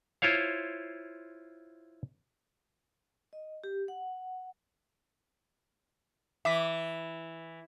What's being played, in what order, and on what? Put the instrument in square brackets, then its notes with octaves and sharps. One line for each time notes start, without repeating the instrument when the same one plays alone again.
[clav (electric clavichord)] E4 F4 C5 C#5 F5
[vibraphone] D#5
G4
F#5
[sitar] E3 [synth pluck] E5 D6 B6